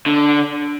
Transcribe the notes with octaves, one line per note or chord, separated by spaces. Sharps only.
D3